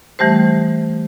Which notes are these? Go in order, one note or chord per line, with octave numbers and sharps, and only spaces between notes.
E3 G3 A3 G4 C5